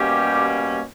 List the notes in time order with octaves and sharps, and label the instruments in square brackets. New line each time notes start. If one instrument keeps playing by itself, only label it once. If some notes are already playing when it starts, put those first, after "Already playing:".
Already playing: [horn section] B2 G3 A#3 C#4 G4